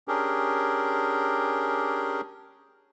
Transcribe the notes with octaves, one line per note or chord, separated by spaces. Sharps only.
C#4 D4 G4 G#4 A#4